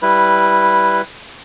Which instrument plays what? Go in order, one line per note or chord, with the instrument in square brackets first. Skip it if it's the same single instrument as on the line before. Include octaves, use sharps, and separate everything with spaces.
[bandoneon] G3 E4 B4